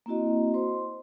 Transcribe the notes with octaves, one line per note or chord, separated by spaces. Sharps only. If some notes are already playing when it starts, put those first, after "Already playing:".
A#3 C4 E4 F#4 D#5
C5 C6